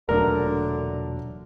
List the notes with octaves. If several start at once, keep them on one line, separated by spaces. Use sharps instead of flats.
E1 A#2 D3 F#3 A3 D4 A#4